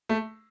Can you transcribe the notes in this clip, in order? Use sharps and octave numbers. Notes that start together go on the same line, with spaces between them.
A3